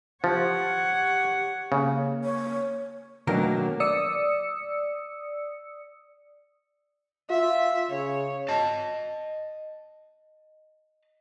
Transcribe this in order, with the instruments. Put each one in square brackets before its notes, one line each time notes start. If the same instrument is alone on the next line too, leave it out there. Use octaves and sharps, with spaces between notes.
[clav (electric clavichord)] F3 [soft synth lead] G4 [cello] C#5 F#5
[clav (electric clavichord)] C#3 [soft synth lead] A#3
[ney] C#5
[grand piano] B2 F#3 A#3 [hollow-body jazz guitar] D3 D#3 A#4 [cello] A3 D4
[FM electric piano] D5 D#6 E6 C#7
[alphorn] F4 [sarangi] E5
[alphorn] C#3 [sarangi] C#5
[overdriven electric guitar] D#5 A5